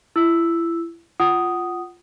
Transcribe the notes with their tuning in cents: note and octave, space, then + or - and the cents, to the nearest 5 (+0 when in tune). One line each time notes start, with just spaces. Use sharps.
E4 +30 E6 +0
F4 +0 F#5 +20 D#6 +0